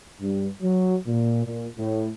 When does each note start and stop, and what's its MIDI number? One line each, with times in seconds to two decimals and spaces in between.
0.21 0.47 43
0.62 0.95 54
1.07 1.44 46
1.46 1.67 46
1.77 2.07 45